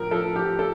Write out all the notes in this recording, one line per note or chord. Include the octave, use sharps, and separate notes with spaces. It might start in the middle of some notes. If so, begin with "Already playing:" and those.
Already playing: A2 F3 A#4
F3 A4
F3 G4
A4